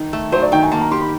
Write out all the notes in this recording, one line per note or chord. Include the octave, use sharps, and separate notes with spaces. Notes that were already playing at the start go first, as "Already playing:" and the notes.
Already playing: D#3
A3
F#3 C5
D5
D#3 G5
G#5
A#3 A5
A#5
G4 C6
B5